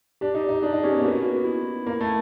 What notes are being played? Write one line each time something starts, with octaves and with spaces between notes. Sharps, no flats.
D4 G4
D#4
D#4
D4 G#4
D#4
C#4 G4
B3
A#3
B3 F#4
F#4
E4
A#3
A3